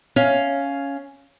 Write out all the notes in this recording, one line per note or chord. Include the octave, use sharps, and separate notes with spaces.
C#4 F5